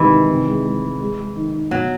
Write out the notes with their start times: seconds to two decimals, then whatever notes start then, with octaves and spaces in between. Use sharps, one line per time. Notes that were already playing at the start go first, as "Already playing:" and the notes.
Already playing: G#2 C3 D#3 E3 G3
0.10 D#3
0.29 C3
0.47 G#3
0.65 G#3
0.82 G#3
1.00 G#3
1.19 G#3
1.36 D#3
1.54 D#4
1.71 B2 F#3